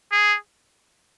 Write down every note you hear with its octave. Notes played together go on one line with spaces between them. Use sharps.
G#4